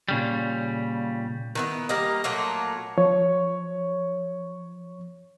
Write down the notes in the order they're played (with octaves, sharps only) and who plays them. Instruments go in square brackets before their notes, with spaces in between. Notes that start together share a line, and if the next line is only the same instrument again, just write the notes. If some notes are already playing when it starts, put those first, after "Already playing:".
[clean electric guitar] A#2 C#3 G3
[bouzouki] D#3 B3 E4
G3 A#3 A#4 D#5
A#2 F#3 A3 A#3
[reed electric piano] F3 [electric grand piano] C#5